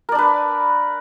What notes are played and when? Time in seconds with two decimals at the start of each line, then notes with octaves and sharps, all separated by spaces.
0.09 A#4
0.12 D5
0.15 D4
0.18 B4